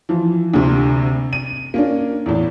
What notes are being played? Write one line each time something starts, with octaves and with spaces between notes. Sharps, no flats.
E3 F3
D2 C3
D#7
A#3 C#4 D4
E2 A2